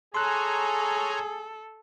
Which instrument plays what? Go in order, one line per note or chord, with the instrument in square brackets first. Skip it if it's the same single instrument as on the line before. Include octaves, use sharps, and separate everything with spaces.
[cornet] G#4 [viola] A4 [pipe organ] C#5 G#5 A#5 [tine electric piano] C6 F#6